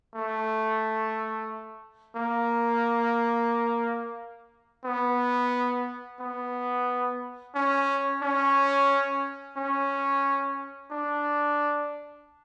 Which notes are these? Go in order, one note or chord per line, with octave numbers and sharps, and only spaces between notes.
A3
A#3
B3
B3
C#4
C#4
C#4
D4